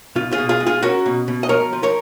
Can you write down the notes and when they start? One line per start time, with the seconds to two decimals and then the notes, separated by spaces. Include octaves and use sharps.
0.16 B2 F4
0.33 F4 G#4
0.38 B2
0.49 F4 G#4
0.60 G#3
0.67 F4 G#4
0.83 C#4 F#4 A#4
1.06 B2
1.28 B2
1.43 D#5
1.49 F3 A#4 C#5
1.73 F3
1.83 A#4 C#5